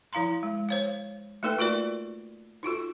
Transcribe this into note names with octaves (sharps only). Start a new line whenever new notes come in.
F3 E4 F5 A#5 C6
G#3
C5 C#5 F5
A3 A#3 D#4 A4 B4 G5
F4 F#4 A#4 D5
D#4 F4 F#4 A4